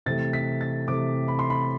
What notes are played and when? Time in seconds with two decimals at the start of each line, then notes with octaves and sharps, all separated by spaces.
0.06 C3 E3 A3 A6
0.33 B6
0.61 A6
0.87 C3 E3 A3 D6
1.28 B5
1.39 C6
1.50 B5